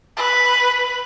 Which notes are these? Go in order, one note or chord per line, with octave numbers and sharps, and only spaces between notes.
B4